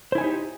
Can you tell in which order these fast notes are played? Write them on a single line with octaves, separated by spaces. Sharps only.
C5 E4 G#5 D#4 G4